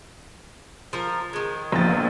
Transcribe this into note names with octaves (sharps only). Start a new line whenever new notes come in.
F3 A#4
D#3 G#3
A#1 E2 F3 A#3 A6